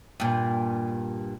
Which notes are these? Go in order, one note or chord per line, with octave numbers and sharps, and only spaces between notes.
G2 A#2